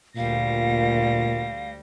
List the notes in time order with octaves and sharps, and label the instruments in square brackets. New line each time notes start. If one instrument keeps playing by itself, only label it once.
[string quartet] D2 G3 A#6 [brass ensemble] A#2 [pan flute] F5